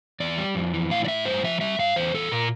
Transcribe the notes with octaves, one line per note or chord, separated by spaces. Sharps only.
E2 D5
G3
F2
E3
A2 F5
D5
A2 E5
G2 C5
F3 E5
G3 E5
G2 F5
E2 C5
E2 A4
A#2 A#4